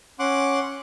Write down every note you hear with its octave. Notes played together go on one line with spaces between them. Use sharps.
C#4 F#5 C6 D6 F#6